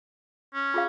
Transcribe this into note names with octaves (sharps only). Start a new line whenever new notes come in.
C#4
F4 G#4 F5